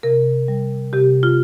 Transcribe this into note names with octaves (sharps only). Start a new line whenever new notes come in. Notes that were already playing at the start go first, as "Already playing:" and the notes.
C3 A#4
G3
C3 G4
F4